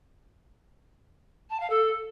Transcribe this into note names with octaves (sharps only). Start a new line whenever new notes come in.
A5
F5
A4